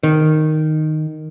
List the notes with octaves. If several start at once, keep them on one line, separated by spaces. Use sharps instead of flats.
D#3